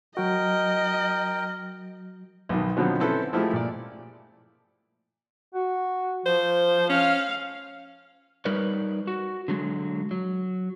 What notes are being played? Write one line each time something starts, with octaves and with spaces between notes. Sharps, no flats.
F#3 F#4 A#4 D#5 G5
B1 B2 D#3
B2 D3 D#3 F3 F#3 C4
C4 C#4 E4 A4 B4 C5
F3 G#3 A3 E4 G4
A#2 D5
F#4
F3 C5
C#4 F5
G3 D#4 A#4 B4 C#5 D5
F#4
D3 F#3 G#3
F#3